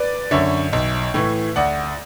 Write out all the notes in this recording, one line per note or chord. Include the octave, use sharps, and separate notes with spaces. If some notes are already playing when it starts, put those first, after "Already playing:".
Already playing: B4 D5
F#2 D3 C#5 E5
B1
A2 E3
D2 D5 F#5